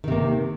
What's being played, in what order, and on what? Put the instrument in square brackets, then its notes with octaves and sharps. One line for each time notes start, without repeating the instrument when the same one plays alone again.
[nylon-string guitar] D#3
C3
A#3